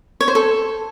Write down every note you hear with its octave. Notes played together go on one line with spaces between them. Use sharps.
C#5
C5
A4